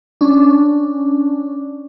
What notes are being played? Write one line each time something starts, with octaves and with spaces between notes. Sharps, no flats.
C#4 D4